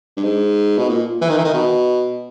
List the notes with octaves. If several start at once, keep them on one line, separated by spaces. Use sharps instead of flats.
G2
G#2
B2
A#2
E3
D#3
E3
D#3
B2